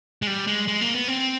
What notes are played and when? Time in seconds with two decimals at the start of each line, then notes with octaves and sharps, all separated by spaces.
0.22 G#3
0.27 G3
0.47 G#3
0.68 G#3
0.81 A#3
0.95 B3
1.08 C4